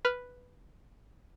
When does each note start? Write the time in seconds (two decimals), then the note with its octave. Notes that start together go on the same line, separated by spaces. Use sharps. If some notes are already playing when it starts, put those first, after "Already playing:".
0.05 B4 F6